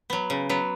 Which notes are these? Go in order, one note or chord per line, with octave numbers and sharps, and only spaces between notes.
F#3 B3
C#3
F#3 B3